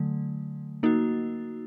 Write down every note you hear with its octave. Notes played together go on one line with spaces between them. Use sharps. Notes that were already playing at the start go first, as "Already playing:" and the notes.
Already playing: D3 F#3 A3
A#3 D#4 F#4